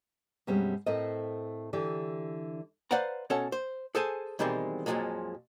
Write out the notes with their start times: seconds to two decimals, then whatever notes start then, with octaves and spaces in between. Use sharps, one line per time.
0.47 F#2 B2 G3 G#3 C4 C#4
0.86 A2 A3 C4 A#4 D#5
1.73 D3 E3 G4 D5
2.91 B4 C5 D5 F5 F#5 A#5
3.30 B2 C#4 A4 C#5 F#5 A5
3.52 C5
3.95 G#4 A4 C5 G#5 A5
4.39 B2 D#3 E3 G3 G#3 C4
4.86 F2 A#2 D3 F3 F#3 G#3